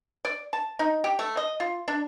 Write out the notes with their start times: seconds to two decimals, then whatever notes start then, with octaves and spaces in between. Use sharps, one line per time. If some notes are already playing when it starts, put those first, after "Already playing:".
0.25 D5
0.53 A5
0.79 D#4
1.04 G4
1.19 A3
1.37 D#5
1.60 F4
1.88 D4